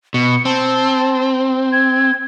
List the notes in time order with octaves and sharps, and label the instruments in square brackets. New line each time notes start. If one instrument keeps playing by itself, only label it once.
[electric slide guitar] B2 [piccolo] C#7
[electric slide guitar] C4 [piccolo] A5
[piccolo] G#6